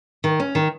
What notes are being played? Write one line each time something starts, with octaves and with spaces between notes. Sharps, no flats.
D#3
C#4
D#3